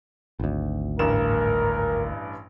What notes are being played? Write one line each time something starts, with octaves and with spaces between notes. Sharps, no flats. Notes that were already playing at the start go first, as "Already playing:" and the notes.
G#1 D2
A1 G2 A#4 E7